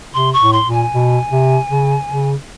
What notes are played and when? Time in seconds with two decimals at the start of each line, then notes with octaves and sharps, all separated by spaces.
0.14 C3 C6
0.33 C#6
0.41 A2
0.53 C6
0.66 A#2
0.72 G#5
0.92 B2
1.31 C3
1.69 C#3
2.08 C#3